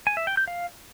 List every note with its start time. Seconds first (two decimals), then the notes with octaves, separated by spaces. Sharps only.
0.07 G#5
0.17 E5
0.27 G5
0.37 G6
0.48 F5